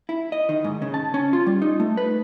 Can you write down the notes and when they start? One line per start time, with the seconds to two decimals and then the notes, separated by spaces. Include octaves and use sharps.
0.09 E4
0.32 D#5
0.49 D#3
0.64 G#2
0.82 C#3
0.94 A5
1.14 C#4
1.33 F4
1.47 G3
1.62 D#4
1.80 A3
1.97 B4